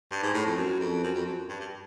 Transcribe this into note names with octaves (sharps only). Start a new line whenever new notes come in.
G2
G#2
A2
F2
F#2
F2
F#2
F2
F#2
G2
G2